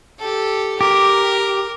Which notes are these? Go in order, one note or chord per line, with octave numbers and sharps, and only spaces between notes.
G4 A4
G4 A#4